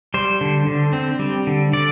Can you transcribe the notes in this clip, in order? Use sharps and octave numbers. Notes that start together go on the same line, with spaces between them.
G3 C5
D3
D3
C4
G3
D3
D3 D5